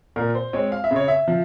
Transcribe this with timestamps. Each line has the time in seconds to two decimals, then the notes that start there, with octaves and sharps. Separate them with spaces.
0.16 A#2 A#4
0.35 C5
0.53 G#3 C4 C#5
0.72 F5
0.84 E5
0.91 C#3
0.96 C#5
1.08 E5
1.28 F3